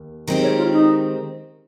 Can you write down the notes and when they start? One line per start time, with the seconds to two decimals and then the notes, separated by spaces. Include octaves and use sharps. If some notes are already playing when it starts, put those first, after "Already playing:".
Already playing: D#2
0.28 D#3 G#3 C4 G4
0.43 C#5
0.58 F4
0.72 D#4